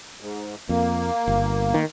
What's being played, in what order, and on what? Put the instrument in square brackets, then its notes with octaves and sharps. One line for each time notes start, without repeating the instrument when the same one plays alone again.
[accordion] G#2
[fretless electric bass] F2 [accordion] A#3
[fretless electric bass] G1
D#3